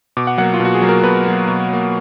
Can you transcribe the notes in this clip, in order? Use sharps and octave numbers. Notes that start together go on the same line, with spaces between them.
B2 D6
F#5
F#3 A#3 F#5
F4
B2 F#4
G#4
F#3 A#3
A#4
B2 B4
F#3 A#3
B2
F#3 A#3